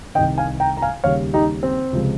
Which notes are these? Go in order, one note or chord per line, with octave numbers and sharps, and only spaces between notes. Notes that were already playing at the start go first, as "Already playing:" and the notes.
C2 C3 D#3 D#5 G5
F5 G#5
G5 A#5
A#5
F5 G#5
D#2 C#3 G3 C#5 F5
D#4 G4
C4
C#2 C3 F3 G#3